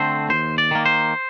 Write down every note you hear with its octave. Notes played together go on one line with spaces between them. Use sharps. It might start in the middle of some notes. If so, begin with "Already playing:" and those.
Already playing: D3 A3 C4 C5
D#2 C5
D5
D#3 A#3
C5